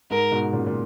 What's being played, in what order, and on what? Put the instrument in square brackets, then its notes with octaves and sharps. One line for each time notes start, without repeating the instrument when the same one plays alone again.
[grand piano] G#2 [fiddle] A#4
[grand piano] G#2 B2
A#2 C#3
A#2